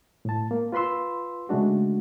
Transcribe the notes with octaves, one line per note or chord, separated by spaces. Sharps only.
A2 A5
A#3
F4 B4 B5 C6 E6
C#3 G#3 A3 D4 F#4